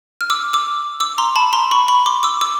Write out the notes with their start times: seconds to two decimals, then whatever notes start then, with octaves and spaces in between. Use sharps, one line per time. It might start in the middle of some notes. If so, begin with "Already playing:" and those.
0.21 F6
0.30 D6 E6
0.53 D6 E6
1.00 D6 E6
1.18 A#5 C6
1.36 A5 B5
1.53 A#5 C6
1.71 B5 C#6
1.88 B5 C#6
2.06 C6 D6
2.23 D6 E6
2.41 D6 E6